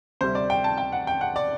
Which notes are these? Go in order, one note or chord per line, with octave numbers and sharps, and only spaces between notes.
D2 C3 G3 C5
D5
G5
A5
G5
F#5
G5
F#5
D5